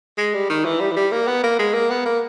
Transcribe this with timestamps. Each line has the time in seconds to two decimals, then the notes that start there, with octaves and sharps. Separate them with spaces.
0.18 G#3
0.34 G3
0.49 D#3
0.65 E3
0.80 G3
0.91 E3
0.96 G3
1.11 A#3
1.27 B3
1.43 A#3
1.59 G#3
1.74 A#3
1.90 B3
2.05 A#3